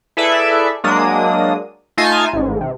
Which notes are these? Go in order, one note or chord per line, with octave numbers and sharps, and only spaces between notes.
E4 G#4 A4 B4 D5 E5
F#3 G#3 A#3 D4 D#6
A3 D#4 F4 G#5 A5
A1 G#2
C3